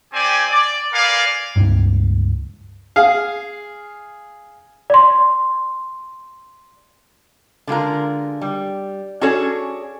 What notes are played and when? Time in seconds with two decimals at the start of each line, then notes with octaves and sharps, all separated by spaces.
0.13 C4 G4 D5 G#5
0.50 D5
0.93 A#4 B4 D5 F5 G#5
1.56 C#2 G2
2.96 G#4 F5
4.90 D5 C6
7.67 D3 G#3 F4 A#4
8.41 G3
9.21 C#4 D4 F#4 G#4 A4 C#5